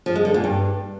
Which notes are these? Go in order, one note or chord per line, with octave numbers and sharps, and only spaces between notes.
F3
G#3
D3
A#2
G2